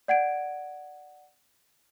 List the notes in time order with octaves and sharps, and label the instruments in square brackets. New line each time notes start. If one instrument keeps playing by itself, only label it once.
[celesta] D5 F#5 G#6 D7